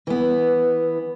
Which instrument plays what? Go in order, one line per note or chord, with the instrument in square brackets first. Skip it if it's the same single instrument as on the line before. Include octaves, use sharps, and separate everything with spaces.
[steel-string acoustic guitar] E3 B3